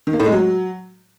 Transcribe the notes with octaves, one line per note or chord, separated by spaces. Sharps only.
D#3
A#3
A2
G#3
F#3